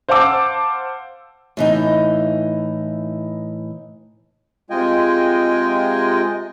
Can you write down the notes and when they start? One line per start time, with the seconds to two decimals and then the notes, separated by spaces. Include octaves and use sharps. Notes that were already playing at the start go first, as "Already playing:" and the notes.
0.09 C5 F5 F#5 A5 D6 E6
1.57 A2 E3 D#4
4.70 C3 G#3 F4 D#5 G5 G#5